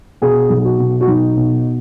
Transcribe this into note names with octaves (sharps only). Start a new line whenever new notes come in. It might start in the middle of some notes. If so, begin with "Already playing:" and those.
B2 G#4
B1
F#4
B2
F#4
B1 D#4
B2